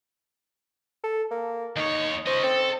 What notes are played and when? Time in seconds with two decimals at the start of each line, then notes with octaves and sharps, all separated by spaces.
1.04 A4
1.31 A#3
1.76 D#2 D#4 C#5
2.27 C#4 C5 D#5
2.44 C4 A4